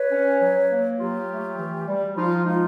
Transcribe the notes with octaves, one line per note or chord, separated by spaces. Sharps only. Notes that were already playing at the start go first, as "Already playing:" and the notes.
Already playing: B4 C#5
C#4
F#3
A#3
F#3 F4 G4
A3
E3
G3
F3 D#4 F4
G#3 D#4 F4